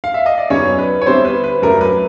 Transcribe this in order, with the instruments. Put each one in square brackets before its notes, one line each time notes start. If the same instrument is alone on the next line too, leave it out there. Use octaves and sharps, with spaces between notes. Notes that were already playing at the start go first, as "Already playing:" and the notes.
[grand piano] F5
E5
D#5
D5
F#2 C#3 F#3 B3 C#4 D#4 C#5
B4
C#5
D3 G3 B3 C4 E4 C5
B4
B4
F#2 C#3 F#3 A3 D4 A#4
B4